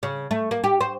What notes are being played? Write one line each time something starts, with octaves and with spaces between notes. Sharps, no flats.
C#3
A3
A#3
G4
C5